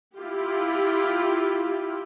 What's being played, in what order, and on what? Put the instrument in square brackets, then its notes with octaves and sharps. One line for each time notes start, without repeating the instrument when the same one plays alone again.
[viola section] E4 F4 G4